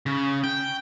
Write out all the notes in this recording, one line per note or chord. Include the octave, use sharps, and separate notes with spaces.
C#3
G5